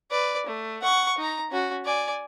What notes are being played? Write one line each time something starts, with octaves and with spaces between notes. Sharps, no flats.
B4 D5
A3
F#5 C#6
D#4 A#5
C#4 F#4
D5 G#5